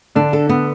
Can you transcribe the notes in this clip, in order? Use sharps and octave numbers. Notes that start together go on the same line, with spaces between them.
D3 D4
A4
B3